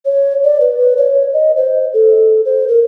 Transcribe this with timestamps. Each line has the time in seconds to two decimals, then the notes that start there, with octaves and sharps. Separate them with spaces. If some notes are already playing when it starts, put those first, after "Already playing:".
0.05 C#5
0.44 D5
0.61 B4
0.78 B4
0.98 C#5
1.33 D#5
1.57 C5
1.94 A4
2.45 C5
2.68 A#4